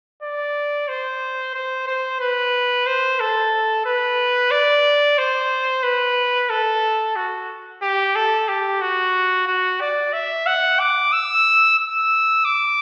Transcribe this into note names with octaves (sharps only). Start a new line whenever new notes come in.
D5
C5
C5
C5
B4
C5
A4
B4
D5
C5
B4
A4
F#4
G4
A4
G4
F#4
F#4
D5
E5
F#5
D6
E6
E6
D6